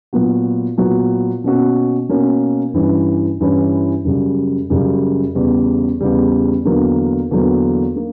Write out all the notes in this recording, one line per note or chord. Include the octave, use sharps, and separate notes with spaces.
A#2 F#3 B3 F#4
A#2 F#3 B3 F#4
B2 A#3 C#4 F#4
B2 A#3 C#4 F#4
G2 E3 G3 C#4 E4
G2 E3 G3 C#4 E4
F#2 C#3 G3
F#2 C#3 G3
E2 C#3 G3
E2 C#3 G3
E2 D3 F#3 A#3
E2 D3 F#3 A#3
A#3